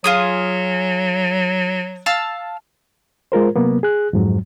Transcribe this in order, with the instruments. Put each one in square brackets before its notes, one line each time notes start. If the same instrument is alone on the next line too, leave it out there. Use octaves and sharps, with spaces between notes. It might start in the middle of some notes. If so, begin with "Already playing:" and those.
[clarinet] F#3 [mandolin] F4 G#4 D#6
[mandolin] F5 A5 E6
[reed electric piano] G#3 F4 A#4 C5
C3 F#3 A#3 B3
G#4 F#6
F2 G#2 F#3